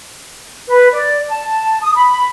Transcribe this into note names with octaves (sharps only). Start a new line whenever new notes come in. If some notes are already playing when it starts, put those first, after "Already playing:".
B4
D5
A5
D#6
B5